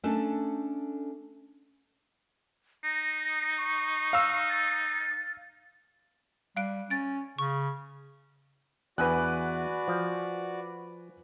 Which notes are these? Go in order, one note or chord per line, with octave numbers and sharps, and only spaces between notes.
A3 C#4 D4 A4 A5
D#4 A#6
C#6
F5 E6
A6
G3 F5 F#6 D7
C#4 A6 D7
C#3 C#6
E2 F#4 B4 D5 G#5 F#6
F3